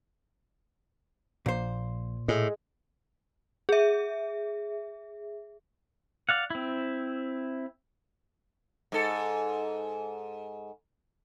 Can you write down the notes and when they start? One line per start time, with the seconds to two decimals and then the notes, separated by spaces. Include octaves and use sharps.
1.46 A#1 A#2 C5
2.28 A2 G#4 D#5
3.69 G#4 E5
6.29 D5 F5 F#5
6.50 C4 E4
8.92 G#2 A4